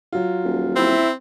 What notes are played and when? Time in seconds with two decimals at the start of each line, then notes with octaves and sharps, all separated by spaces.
0.13 F#3 F4
0.44 D#1
0.76 C4 E4